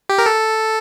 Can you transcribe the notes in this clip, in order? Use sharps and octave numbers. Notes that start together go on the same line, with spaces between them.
G4
A#4
A4